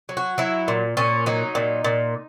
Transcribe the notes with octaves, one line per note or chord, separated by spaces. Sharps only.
F#3
F#4
F#3 E4
A#2
A#2 C#4
F#3 D#4
A#2
A#2